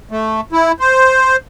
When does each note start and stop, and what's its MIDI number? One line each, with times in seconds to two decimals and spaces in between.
0.11 0.41 57
0.53 0.72 64
0.80 1.36 72